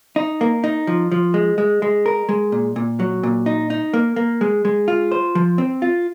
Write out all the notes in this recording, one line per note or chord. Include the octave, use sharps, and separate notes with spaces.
D#4
A#3
D#4
F3
F3
G#3
G#3
G#3
A#4
G#3
A#2
A#2
F#3
A#2
D#4
D#4
A#3
A#3
G#3
G#3
F4
C5
F3
C4
F4